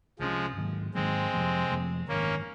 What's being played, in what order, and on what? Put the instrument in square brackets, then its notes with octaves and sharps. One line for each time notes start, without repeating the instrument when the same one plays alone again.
[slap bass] C2 C3 F#3 C#4 [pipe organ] F3 G#3
[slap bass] G#2 D#3 F#3 A#3
[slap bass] G#2 D#3 F#3 A#3 [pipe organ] G#3 C4
[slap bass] F2 C3 F3 A#3
F2 C3 F3 A#3
[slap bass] G#1 F#2 D#3 [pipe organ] A#3 C#4